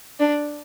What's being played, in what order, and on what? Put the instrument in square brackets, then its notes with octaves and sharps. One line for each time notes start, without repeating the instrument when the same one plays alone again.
[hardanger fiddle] D4